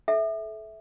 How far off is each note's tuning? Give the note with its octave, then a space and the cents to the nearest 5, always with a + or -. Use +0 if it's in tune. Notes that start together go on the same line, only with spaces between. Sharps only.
A4 -35 E5 -10